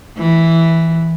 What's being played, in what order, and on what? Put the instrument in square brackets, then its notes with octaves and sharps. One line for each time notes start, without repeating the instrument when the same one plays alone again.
[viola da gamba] E3